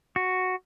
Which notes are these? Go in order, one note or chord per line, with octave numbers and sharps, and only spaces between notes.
F#4